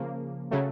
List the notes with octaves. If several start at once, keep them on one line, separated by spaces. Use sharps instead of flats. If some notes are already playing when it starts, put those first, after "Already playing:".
Already playing: C#3 F3 A#3
C#3 F#3 A3